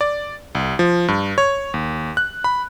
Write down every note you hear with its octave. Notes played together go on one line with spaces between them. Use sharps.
D5
C2
F3
G2
C#5
D#2
F#6
B5